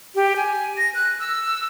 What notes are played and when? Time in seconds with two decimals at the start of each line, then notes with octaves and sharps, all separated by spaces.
0.15 G4
0.36 G#5
0.78 A#6
0.95 F#6
1.20 E6